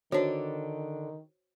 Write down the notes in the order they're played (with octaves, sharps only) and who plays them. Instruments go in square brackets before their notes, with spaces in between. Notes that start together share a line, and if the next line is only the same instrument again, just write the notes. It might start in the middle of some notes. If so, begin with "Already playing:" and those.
[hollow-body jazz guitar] D3 D4 [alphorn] D#3 [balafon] F#4 C5 C#5